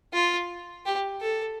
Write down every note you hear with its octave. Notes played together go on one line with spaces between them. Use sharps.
F4
G4
A4